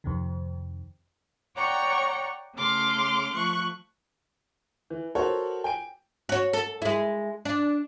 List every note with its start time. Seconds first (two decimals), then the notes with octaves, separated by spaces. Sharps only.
0.04 F2 C3 D#3
1.55 C#5 D5 F#5 G5 A#5 C#6
2.55 C#3 A3 C6 D6 F6
3.34 F3 A3 C#6 F#6
4.90 E3
5.15 F#4 A4 A#4 C5 C#5 F#5
5.64 G5 G#5 D7
6.29 F#4 C#5
6.53 A4
6.82 G#3 E4
7.45 D4